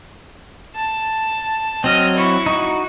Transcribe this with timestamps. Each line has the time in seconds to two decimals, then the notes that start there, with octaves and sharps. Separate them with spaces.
0.76 A5
1.84 F#3 C4 D#5 F6
2.16 E4 C#6
2.46 D#4 F#4